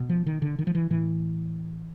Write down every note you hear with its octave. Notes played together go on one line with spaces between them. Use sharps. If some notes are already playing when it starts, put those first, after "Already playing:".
Already playing: B2
F3
D#3
D3
D#3
F3
E3
A2 E3